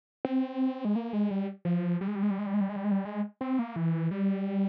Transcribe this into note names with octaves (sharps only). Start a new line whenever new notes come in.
C4
G#3
A#3
G#3
G3
F3
G3
G#3
G3
G#3
G3
G#3
G3
G#3
G3
G#3
G3
G#3
G3
G#3
C4
A#3
E3
G3